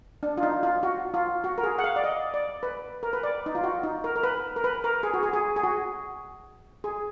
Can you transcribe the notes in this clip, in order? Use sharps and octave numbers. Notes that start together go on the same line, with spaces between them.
D4
F4
D#4
F4
F#4
F4
F#4
A#4
G#4
F#5
F5
D5
D#5
D5
B4
A#4
B4
D5
D#4
F4
F#4
D#4
A#4
A#4
B4
A#4
B4
A#4
G#4
F#4
G#4
G#4
G#4
F#4
G#4